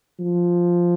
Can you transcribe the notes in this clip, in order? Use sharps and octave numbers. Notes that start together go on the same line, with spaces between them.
F3